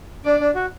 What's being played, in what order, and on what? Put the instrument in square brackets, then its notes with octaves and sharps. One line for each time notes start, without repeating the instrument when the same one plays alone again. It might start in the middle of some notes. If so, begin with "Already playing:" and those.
[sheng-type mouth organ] D4 [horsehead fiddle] D5
[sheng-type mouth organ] D4
F#4